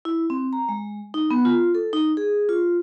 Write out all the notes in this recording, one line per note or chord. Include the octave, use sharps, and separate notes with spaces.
E4
C4
A#5
G#3
D#4
B3
F4
A4
D#4
G#4
F4